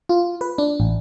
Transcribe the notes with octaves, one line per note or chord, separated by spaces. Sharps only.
F4
B4
D4
A1